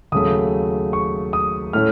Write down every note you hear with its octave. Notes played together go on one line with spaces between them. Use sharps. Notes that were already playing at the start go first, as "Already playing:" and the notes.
D#2 C#3 F#3 A3 D#6
C#6
D#6
A2 A3 C#4 F6